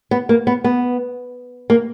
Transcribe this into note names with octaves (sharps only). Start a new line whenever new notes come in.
B3
A#3
B3
B3
A#3